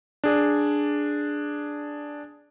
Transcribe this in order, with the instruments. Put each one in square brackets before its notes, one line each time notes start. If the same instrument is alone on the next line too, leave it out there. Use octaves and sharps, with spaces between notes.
[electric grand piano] D4 G#4 D5